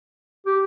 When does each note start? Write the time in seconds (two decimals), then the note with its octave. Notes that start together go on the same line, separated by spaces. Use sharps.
0.46 G4